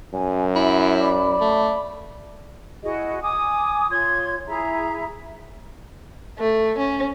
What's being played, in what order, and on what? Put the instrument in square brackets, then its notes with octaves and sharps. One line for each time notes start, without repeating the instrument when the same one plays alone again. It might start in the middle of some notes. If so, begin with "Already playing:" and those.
[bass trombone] F#2 [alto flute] G#5
[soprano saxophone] E4 [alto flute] B5
[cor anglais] D5
[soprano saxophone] A3
[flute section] E4 F#4 G#4 D#5
G#5 D6 D#6
F4 C#5 C6 G#6
E4 G#4 E5 A#5
[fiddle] A3
C#4